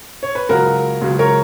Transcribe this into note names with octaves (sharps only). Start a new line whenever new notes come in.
C#5
B4
C#2 C#3 F#3 F#4 A#4
C#2 C#3 F#3
A#4 C#5